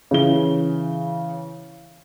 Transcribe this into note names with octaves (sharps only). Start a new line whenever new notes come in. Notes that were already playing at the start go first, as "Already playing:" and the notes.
C#3 E3 G7